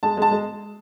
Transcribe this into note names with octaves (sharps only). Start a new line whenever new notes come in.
G#3 A5
G#3 A5
G#3